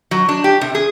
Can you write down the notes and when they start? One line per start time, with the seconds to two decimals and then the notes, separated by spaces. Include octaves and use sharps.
0.11 F#3
0.29 D4
0.44 G4
0.61 C3
0.75 G#4